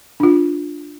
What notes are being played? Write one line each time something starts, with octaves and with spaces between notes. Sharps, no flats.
D4 F4